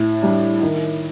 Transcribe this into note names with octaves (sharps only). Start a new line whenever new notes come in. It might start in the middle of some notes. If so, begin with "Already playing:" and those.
Already playing: A2
G3 D4
D#3